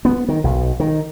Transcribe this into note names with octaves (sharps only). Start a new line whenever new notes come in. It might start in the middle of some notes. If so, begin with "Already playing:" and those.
B3
D#3
B1
D#3